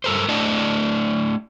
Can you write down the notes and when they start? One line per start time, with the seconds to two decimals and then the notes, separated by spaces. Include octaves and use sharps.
0.04 G2 A4 A#4 C5
0.28 A3 D4 E4 D#5 G5